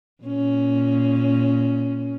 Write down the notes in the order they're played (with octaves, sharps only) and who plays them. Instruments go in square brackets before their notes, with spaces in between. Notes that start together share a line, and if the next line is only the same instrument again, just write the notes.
[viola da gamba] A#2 C#4